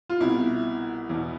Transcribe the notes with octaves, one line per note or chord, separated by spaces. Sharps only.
F4
C2 B2 E4
E2 B2